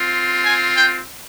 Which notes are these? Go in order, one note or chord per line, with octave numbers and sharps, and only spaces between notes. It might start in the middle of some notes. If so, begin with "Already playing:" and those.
Already playing: C4 F4
G#5
G5